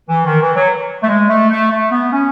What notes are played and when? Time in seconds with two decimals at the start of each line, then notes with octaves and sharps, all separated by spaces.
0.09 E3
0.25 D#3
0.41 E3
0.56 F#3
1.03 A3
1.08 G#3
1.29 A3
1.50 A3
1.71 A3
1.91 B3
2.12 C#4